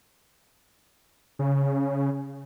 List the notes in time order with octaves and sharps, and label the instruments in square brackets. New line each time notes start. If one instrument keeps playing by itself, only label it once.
[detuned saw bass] C#3